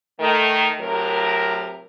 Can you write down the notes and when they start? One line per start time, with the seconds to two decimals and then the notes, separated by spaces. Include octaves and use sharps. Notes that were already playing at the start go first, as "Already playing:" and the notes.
0.20 D#3 A3
0.80 A2 C3 F#3 A#4